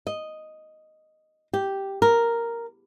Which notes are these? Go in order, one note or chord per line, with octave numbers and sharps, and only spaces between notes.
D#5
G4
A#4